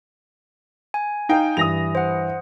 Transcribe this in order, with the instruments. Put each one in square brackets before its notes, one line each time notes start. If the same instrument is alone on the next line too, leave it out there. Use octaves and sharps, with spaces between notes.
[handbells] G#5
[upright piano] D#4 F5 G5
[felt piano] G2 E3 [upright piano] D#6 A#6 F7
[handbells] C5 F#5